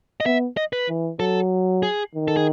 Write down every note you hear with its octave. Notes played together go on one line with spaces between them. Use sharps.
D#5
B3 E5
D#5
B4
E3
F#3 A4
G#4
D#3
A4
G#4